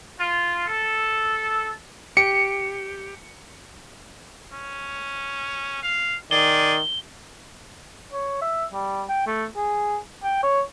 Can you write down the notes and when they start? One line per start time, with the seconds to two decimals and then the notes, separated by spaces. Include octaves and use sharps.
0.18 F4
0.66 A4
2.17 G4 C#7
4.53 C#4
5.83 F5
6.31 D#3 G#4 D5 G7
8.13 C#5
8.41 E5
8.73 G3
9.09 G5
9.27 A3
9.57 G#4
10.23 G5
10.43 C#5